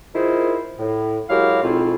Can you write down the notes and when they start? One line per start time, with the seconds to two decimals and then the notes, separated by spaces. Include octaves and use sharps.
0.14 D#3 E4 F4 G#4 A#4 C5
0.78 A2
1.29 F#3 G#3 E4 G4 A#4 F5
1.63 F2 G#2 B2 C4 E4 F4